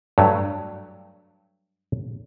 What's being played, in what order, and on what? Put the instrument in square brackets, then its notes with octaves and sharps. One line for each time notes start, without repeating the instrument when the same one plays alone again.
[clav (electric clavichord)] G2 F#3 A3